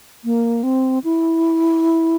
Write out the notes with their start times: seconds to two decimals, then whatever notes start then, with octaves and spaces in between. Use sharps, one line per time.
0.25 A#3
0.63 C4
1.04 E4